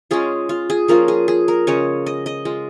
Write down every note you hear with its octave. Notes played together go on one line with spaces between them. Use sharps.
G#3 C#4 F4 G#4
F4
G#4
F3 A#3 C#4 F4 A#4
G#4
G#4
A#4
C#3 G#3 C#4 C#5
D#5
D#5
G#3 F4